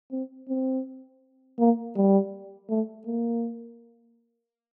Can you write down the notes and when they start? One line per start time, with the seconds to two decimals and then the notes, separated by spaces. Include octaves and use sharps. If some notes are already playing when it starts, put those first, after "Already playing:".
0.12 C4
0.49 C4
1.59 A#3
1.96 G3
2.70 A3
3.07 A#3